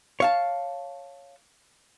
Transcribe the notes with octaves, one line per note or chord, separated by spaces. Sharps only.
C#5 F5 A5